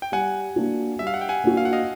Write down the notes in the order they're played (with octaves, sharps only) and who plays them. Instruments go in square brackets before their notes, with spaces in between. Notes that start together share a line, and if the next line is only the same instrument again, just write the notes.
[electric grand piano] G5
[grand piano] G3 [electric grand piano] F#5 G#5
[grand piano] A#3 D4 F#4
[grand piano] G3 [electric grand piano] E5
[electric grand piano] F5
F#5
G5
F#5 G#5
[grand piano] A#3 D4 F#4
[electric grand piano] F5
F#5
D#5 F5